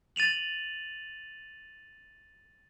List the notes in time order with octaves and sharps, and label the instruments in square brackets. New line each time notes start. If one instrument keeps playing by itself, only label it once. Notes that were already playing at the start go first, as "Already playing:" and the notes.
[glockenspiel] A6 D#7 F7 F#7